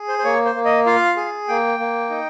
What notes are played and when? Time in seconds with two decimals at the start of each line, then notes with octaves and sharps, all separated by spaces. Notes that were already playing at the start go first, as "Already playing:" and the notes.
Already playing: G#4
0.08 C5
0.18 C5
0.24 A#3 C#5
0.45 C5
0.55 A#3
0.65 D#5
0.86 F4 F5
1.17 G#4
1.48 A#3 G5
1.79 A#3
2.10 D#4